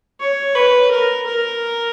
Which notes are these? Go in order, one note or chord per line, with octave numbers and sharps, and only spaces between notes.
C#5
B4
A#4
A#4